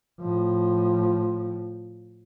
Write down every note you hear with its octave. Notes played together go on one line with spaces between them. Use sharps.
A2 F3